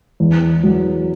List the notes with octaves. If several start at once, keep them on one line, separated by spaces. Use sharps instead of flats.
E2
F#3